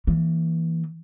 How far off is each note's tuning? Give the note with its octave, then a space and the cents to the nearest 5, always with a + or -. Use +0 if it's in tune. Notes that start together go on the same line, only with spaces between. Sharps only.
E3 -10 A#3 +0